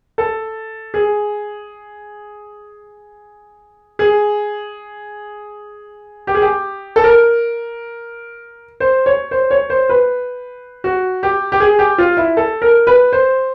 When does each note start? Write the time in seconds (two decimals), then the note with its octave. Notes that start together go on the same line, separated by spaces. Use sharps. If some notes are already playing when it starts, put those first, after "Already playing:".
0.18 A4
0.94 G#4
3.99 G#4
6.27 G4
6.35 G#4
6.42 G4
6.96 A4
7.04 A#4
8.80 C5
9.06 C#5
9.31 C5
9.51 C#5
9.70 C5
9.89 B4
10.84 F#4
11.23 G4
11.52 G4
11.60 G#4
11.79 G4
11.98 F4
12.17 E4
12.37 A4
12.62 A#4
12.87 B4
13.13 C5